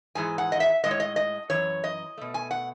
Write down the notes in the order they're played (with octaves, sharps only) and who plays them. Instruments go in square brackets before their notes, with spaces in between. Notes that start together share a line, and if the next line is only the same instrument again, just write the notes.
[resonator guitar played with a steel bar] G#2 E3 G#3 G#5
F#5
D#5
E5
A2 G#3 D#5
C#5
D#5
D#5
F#2 E3 C#5
D#5
B2 A3
G#5
F#5